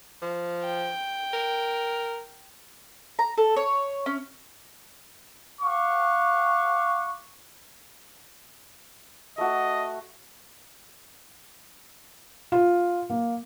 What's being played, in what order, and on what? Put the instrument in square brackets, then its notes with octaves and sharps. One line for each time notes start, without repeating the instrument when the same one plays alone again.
[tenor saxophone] F3
[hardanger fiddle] G5
[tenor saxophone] A#4
[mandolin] A#5
A4
C#5
C#4
[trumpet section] F5 F#5 C#6 D6
[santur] A3 F#4 [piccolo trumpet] D#5
[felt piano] F4
A#3